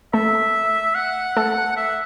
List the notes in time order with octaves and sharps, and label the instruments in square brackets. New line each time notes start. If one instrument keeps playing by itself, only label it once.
[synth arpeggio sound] A3 A4 [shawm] E5
[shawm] F#5
[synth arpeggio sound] A3 A4
[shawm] E5